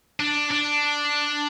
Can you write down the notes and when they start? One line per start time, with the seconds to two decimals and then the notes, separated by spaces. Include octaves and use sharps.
0.20 D4
0.51 D4